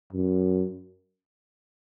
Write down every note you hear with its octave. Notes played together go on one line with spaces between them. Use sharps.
F#2